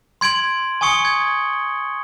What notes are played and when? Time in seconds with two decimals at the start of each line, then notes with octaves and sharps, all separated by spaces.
0.21 C6 G#6 D7 F#7
0.81 G#5 C#6 D#6 C#7 G7
1.05 G#6